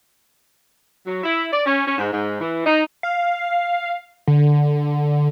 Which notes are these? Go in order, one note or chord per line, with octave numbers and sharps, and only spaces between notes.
F#3
E4
D5
C#4
C#4
G#2
G#2
E3
D#4
F5
D3